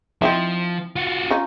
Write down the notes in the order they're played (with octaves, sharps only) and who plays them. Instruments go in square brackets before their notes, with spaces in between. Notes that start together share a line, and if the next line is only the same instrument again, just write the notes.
[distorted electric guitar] F3 [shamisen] C4 D#4 E4
[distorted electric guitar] F4 F#4
[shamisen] C#4 D#4 F4